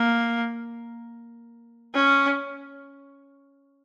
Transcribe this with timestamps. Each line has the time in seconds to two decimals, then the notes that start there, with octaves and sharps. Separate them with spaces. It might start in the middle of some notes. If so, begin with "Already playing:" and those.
Already playing: A#3
1.94 C#4